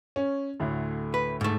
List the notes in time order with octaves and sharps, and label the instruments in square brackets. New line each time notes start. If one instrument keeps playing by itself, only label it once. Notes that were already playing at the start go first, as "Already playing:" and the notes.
[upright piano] C#4
D2 A2 D3
[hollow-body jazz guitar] B4
G#2 A3